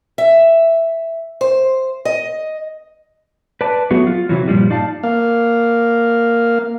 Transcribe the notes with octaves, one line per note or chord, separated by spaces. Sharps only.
E5
C5
D#5
B4 D5 A5
F#3 A3 B3 F#4 G#4
F4
C3 E3 F#3
G2 A#2 F3 G3
D#4 D5 F5 A5
A#3 F5